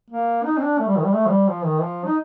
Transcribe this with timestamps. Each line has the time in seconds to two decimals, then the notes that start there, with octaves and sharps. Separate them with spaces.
0.11 A#3
0.45 D#4
0.58 C4
0.63 D4
0.79 A3
0.88 G3
0.97 D#3
1.05 G3
1.14 A3
1.26 F3
1.30 G3
1.49 F3
1.66 D#3
1.83 F3
2.06 D#4